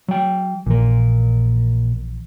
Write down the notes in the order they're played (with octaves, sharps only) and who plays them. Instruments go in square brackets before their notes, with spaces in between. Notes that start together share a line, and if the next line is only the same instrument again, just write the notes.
[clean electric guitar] F#3 G5
[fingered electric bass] A#1 E3 [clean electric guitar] A#2 A#4